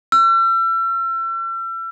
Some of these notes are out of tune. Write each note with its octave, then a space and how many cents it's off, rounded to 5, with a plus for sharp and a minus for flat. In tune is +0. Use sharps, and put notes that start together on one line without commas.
E6 +40